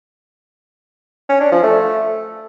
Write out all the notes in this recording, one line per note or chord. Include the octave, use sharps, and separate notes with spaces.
C#4
D4
F3
A3